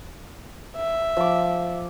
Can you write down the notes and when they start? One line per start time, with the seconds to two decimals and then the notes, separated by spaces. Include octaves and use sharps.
0.77 E5
1.17 F3 D6